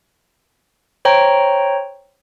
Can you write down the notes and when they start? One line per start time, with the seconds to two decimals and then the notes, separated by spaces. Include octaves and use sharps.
1.05 C5 C#5 G5 A#5